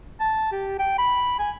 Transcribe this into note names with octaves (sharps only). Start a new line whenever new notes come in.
A5
G4
G5
B5
G#5